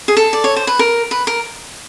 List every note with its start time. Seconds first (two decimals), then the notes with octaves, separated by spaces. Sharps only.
0.08 G#4
0.17 A4
0.33 D5
0.44 C#5
0.56 C5
0.67 B4
0.79 A#4
1.11 B4
1.27 A#4